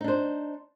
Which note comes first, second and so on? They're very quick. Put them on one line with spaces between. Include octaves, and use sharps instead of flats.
D#4 D4 C5